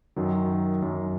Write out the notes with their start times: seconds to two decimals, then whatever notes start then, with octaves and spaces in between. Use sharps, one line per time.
0.16 F#2 D#3 F#3
0.82 F#2 D#3 F#3